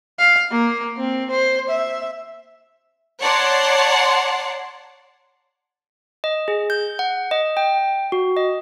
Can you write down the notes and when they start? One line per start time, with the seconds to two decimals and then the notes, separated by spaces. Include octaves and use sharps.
0.19 F5
0.51 A#3
0.97 C4
1.30 C5
1.69 E5
3.21 C#5 D5 F#5 A5 A#5 C6
6.24 D#5
6.48 G#4
6.70 G6
6.99 F#5
7.31 D#5
7.57 G5
8.12 F#4
8.37 D#5